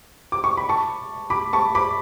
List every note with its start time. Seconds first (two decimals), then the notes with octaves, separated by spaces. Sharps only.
0.32 D6
0.44 C#6
0.57 B5
0.69 A5 C#6
1.30 B5 D6
1.53 A5 C#6
1.75 B5 D6